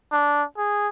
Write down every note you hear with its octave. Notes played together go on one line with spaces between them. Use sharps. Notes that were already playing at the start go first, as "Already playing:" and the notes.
D4
G#4